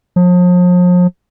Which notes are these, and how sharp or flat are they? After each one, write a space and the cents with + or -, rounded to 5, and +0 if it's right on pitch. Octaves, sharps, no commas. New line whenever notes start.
F3 +40